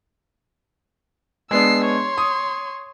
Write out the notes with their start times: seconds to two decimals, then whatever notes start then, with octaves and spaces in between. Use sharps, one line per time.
1.51 G#3 B3 D4 E6 C7
1.85 C#5 C6
2.18 D#6